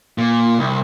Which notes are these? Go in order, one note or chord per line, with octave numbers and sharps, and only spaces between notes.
A#2
C2